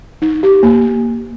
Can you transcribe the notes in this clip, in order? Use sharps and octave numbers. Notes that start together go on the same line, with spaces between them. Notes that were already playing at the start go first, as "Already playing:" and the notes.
D#4
G4
A#3